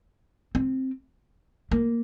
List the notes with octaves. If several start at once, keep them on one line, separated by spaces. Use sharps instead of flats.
C4
A#3